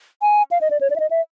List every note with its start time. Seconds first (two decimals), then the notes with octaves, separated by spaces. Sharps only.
0.22 G#5
0.51 F5
0.61 D#5
0.71 D5
0.81 C#5
0.90 D5
0.96 E5
1.00 D#5
1.11 E5